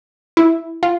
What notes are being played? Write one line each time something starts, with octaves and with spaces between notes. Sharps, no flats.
E4
F4